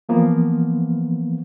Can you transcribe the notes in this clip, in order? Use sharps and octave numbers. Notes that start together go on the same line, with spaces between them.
E3 F3 A#3 B3